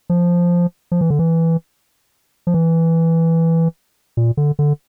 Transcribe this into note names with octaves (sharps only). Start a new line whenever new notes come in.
F3
F3
E3
D3
E3
F3
E3
A#2
D3
D3